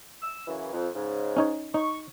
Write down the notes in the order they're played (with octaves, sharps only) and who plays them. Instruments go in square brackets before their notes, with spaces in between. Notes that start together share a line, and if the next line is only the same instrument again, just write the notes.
[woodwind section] E6
F#2 C#3 E3
F2
G#2 C#3
[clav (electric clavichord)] C#4 D#4 C#5
[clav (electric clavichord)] D#4 [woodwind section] C#6